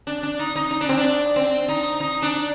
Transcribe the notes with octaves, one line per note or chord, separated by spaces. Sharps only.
D4
D4
D#4
D#4
D#4
D4
C4
D4
C4
D#4
D#4
D4